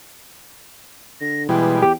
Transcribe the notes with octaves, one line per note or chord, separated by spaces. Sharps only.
D3 A#6
B2 E3 G3 G#3 G5
E2 G4